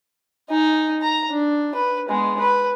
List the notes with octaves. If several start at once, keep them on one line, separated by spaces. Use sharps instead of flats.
D#4 G#5
A#5
D4
B4
G#3 B3
B4